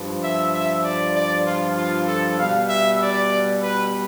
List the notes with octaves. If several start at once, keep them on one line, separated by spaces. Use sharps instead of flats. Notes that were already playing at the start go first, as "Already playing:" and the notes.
Already playing: G2 F3
E5
E5
D5
D5
F4
F4
A4
B2 G3 F5
E5
D5
B4